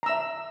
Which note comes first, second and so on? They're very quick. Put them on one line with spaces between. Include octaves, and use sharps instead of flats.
A#5 E6 E5 A5